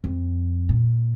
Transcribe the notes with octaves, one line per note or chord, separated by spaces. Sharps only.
F2
A#2